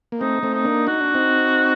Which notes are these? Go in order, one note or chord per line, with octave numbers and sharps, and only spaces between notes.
A#3
A3 C4 D#4
A3 C4
D#4
A#3 D4
D#4 F#4
D4
C4 D#4